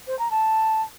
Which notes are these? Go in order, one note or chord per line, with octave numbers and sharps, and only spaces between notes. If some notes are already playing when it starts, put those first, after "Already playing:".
C5
A#5
A5